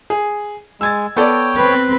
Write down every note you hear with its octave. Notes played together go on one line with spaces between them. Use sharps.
G#4
G#3 E6 G#6 A6
B3 A4 C#5 D5 G5
C4 B4